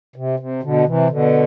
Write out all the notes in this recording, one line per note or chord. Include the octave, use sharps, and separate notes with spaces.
C3
C3
B2 D3
C3 E3
B2 D3